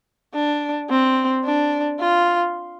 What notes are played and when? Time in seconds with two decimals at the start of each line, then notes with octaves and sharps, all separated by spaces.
0.34 D4
0.90 C4
1.44 D4
2.00 F4